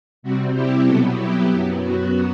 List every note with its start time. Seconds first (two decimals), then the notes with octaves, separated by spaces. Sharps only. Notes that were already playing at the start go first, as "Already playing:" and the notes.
0.23 C3 G3 C4 F#4
0.54 E4 G4
0.86 B2 F#3 B3 F#4 A4
1.18 E4 G4
1.49 F#2 F#3 B3
1.81 F#4